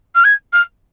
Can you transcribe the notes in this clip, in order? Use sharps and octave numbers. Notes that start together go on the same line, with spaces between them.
F6
G#6
F6